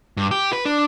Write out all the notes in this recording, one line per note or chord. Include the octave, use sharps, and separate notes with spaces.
G2
G4
B4
D4